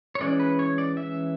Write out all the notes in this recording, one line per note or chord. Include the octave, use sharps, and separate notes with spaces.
C#5
E3 G#3 C#4 D5
B4
C#5
D5
E5